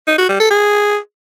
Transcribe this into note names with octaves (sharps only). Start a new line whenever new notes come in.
D#4
F#4
G3
A4
G#4